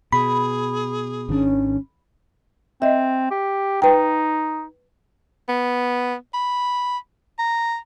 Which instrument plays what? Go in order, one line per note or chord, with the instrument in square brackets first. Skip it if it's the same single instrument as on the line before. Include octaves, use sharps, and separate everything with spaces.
[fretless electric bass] B2 [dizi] G#4 [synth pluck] B5
[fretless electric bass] G#1 D#3 D4 [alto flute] C#4
[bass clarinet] C4 [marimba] D#5 E5
[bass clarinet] G4
[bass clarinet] D#4 [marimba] B4 G5
[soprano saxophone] B3
B5
A#5